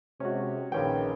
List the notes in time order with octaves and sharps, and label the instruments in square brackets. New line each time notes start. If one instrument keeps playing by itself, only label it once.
[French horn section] C3 G#3 [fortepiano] C#4 F#4
[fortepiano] A#1 C#4 G5 [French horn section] D#3 G#4 B4